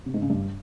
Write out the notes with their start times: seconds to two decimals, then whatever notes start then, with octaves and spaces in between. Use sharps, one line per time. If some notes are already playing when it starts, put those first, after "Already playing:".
0.06 C3
0.14 G#2
0.22 C#3
0.30 G2